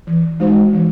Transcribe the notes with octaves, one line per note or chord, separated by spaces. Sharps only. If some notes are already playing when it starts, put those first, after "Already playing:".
E3
G#3 D#4 F#4 C5
E3